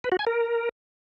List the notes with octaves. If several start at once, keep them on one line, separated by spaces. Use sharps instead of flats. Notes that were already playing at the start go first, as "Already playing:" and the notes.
B4
F#4
G#5
A#4